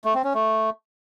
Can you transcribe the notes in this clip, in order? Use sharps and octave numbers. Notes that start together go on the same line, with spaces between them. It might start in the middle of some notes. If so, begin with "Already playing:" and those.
A3
C4
C#4
A3